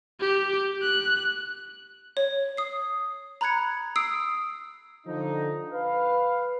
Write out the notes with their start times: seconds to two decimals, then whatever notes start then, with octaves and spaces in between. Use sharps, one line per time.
0.20 G4
0.82 F#6
2.17 C#5
2.57 D#6 C7
3.41 A#5 B5 F#6 G#6 C#7
3.96 D#6 E6 C7 D7
5.07 D3 F3 D#4
5.72 B4 F5